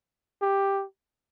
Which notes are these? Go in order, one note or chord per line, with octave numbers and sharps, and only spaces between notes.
G4